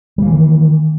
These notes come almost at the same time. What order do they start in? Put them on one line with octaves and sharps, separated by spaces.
G3 A#3 E3 D#3